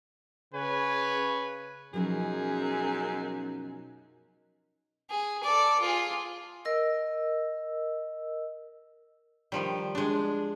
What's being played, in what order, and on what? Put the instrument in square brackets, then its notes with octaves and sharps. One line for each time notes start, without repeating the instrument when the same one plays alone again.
[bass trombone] C#3 [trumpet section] B4 C#5 G#5
[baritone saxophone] F#2 [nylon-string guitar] B2 F3 F#3 [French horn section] C#4 D#4 A#4 [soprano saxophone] G#4
[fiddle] G#4
A4 D5
F4 G#4
[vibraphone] A#4 D#5 E6
[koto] D#3 F3 G3
G#3 D4